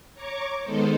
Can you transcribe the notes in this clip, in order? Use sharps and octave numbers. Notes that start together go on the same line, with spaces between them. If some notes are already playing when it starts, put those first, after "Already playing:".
C#5 A#5 C#6 D6
D#3 G#3 B3 D#4 A4 C5